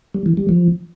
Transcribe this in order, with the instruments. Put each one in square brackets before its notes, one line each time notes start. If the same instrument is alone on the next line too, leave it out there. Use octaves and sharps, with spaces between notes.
[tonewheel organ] G3
E3
G3
F3